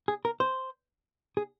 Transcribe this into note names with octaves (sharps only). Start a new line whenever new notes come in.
G#4
A#4
C5
G#4